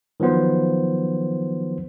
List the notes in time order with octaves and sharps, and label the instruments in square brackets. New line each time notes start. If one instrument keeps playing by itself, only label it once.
[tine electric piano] D#3 F3 F#3 B3 C5